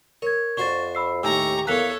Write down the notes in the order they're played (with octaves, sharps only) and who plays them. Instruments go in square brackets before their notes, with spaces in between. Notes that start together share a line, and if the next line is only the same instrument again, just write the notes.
[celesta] A#4 G#6 [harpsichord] C#5
[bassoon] F2 [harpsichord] D4 F#4 C5 [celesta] C#6 A6
[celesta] B5 E6 C7
[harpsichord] D#2 A2 [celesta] D#4 G#5 E6 [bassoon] G4 [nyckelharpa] A#5 C#6
[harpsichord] E2 G#5 [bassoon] A#3 [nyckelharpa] A4 C#5 [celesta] F#6 B6 F7